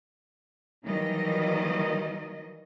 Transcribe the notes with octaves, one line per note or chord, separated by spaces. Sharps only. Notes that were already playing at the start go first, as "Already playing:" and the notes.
D#3 E3 F#3 G3 A#3 D#5